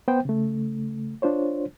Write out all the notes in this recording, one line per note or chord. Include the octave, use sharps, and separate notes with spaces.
B3 C5 G5
C#3 A3
D4 F4 C5 C#5